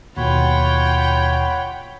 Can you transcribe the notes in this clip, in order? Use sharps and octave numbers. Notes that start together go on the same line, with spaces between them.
D#2 B2 F4 C#5 F#5 G5 B5